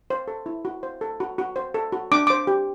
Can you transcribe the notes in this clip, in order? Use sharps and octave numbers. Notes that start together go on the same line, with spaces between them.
C5
A4
E4
F#4
C5
A4
F#4
F#4
C5
A4
F#4
D4 D6
C5 D6
G4